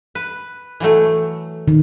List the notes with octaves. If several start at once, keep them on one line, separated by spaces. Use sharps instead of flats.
B4
E3 F#3 A3
D#3